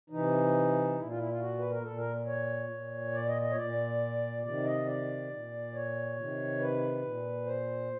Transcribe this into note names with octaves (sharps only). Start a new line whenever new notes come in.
C3 E3 D#4
A#2 E4
F4
E4
F4
F#4
B4
A#4
A#2 A4
A#4
C#5
A#2
D5
D#5
D#5
C#5
A#2 D5
C3 D#3 D5
D#5
D5
A#2
C#5
C3 D#3
B4
A#2
C5